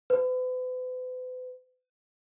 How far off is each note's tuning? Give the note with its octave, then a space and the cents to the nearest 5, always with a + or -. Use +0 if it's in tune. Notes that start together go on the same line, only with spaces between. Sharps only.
B4 +40